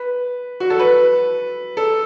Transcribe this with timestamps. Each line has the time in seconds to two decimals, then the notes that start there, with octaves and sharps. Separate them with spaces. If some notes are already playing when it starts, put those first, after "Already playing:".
Already playing: B4
0.60 F#4
0.70 A4
0.79 B4
1.77 A4